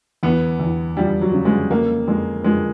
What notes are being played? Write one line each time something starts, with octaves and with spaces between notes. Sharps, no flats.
E2 B3
E2
F3 G3
F#3
C#3
G#3
F2 A#3
F2 G#3
F3 G#3